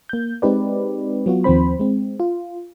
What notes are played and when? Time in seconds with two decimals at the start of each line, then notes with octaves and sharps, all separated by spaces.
0.09 A#3 G6
0.42 G#3 C4 D#4 G4 B4 D5
1.26 F#3 B3 F4 F#4
1.44 D#2 D#3 F3 C4 C5 B5
1.80 G#3 C4
2.20 F4